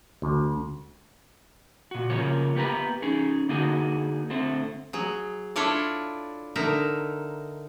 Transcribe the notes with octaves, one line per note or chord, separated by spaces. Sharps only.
D2
A#2 F#4
C#3 F3 A#3 C#5
A#3 B3 G4 B4 A#5
C#4 D#4 G#4
D3 A#3 D#4 F#4 G#4
D3 A3 C4 C5
F#3 G#4
D4 E4 F4 A4 C#5 D5
D3 D#4 A#4 E5 A#5